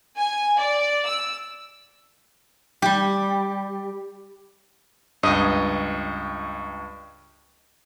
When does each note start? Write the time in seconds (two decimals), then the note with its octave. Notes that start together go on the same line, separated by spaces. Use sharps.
0.17 G#5
0.56 D5
1.06 E6
2.82 G3 G4
5.23 C#2 G2 D#5